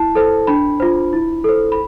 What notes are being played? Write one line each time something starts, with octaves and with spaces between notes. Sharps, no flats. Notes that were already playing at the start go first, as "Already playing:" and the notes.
Already playing: E4 A5
A4 C5
D4 B5
F4 C5
E4
A4 C5
B5